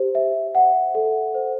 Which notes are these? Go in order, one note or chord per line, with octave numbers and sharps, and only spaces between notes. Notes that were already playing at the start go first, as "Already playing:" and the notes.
Already playing: G4 C5
E5
F#5
A4
C5